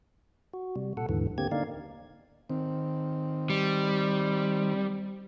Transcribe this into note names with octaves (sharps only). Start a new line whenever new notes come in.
F#4
C3 G3
A#2 A4 F#5
D#2 G#2 D3 E3
D3 A#3 C4 G4 G#6
D3 A#3 D#4 D5 F5
D#3 C4
G3